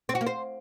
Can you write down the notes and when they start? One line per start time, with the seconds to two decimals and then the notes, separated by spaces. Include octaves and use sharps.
0.09 C4
0.15 F#4
0.21 A#3
0.27 C5